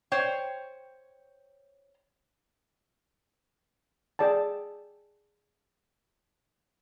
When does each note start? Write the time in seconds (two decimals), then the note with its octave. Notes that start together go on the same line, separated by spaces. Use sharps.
0.12 C5 C#5 G5
4.19 G#4 D5 G5 A5